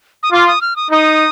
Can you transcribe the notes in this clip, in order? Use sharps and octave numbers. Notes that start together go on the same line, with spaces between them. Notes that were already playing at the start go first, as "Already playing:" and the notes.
D#6
F4 D6
D#6
F6
D#6
D#4 D#6